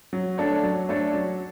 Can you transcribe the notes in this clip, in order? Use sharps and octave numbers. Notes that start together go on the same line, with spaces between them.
F#3
A3 D4 A4 C#5
F#3
A3 D4 A4 C#5
F#3